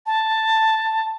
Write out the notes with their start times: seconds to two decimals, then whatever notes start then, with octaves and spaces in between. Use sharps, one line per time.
0.06 A5